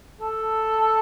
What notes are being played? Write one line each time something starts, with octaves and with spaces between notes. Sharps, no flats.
A4